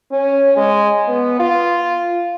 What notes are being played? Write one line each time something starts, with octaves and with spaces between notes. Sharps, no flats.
C#4
G#3
B3
F4